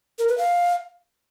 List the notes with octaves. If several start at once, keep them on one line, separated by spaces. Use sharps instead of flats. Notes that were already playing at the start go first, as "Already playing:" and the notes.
A#4
B4
F5